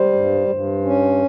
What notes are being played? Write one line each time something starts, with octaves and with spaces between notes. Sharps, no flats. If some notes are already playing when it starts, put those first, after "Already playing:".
Already playing: G3 C5
G2
G2
C#4